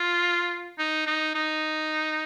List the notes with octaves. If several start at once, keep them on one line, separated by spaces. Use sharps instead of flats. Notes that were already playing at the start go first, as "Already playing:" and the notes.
Already playing: F4
D#4
D#4
D#4